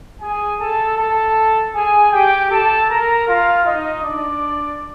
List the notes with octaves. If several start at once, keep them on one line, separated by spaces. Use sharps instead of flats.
G#4 G#5
A4 A5
A4 A5
G#4 G#5
G4 G5
A4 A5
A#4 A#5
F4 F5
D#4 D#5
D4 D5